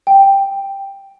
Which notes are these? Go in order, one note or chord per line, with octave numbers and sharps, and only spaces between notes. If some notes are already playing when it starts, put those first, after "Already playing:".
G5